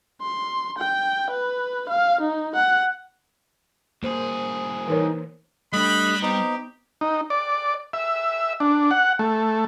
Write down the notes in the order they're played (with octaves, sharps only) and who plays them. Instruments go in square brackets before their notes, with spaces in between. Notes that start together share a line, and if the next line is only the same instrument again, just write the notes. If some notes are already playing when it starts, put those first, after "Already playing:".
[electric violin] C6
G5
B4
F5
D#4
F#5
[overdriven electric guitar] C2 G#4 [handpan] A#3 C5
[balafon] E3 A#4 C#5 [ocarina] D#4
[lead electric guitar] G3 [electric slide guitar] A3 D4 [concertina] D#5 F#6 [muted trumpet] B5
[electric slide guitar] B3 C4 [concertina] D#4 [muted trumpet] G4
[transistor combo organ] D#4
D5
E5
D4
F#5
A3